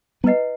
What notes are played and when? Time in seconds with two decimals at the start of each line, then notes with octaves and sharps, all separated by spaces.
0.24 G3 B3 E4 B4 D#5 F#5